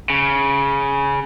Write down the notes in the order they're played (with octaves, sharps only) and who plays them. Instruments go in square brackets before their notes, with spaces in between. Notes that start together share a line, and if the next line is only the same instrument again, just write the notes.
[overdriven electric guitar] C#3